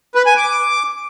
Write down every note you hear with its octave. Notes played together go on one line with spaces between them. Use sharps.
B4
G#5
D6